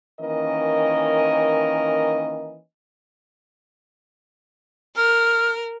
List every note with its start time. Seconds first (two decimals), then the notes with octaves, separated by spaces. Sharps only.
0.19 D#3 E3 A#3 C#4 A#4 D#5
4.97 A#4 F6